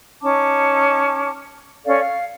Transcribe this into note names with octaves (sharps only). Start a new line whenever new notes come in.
C#4 D#4 A5 D6
C#4 A4 D5 F5
F5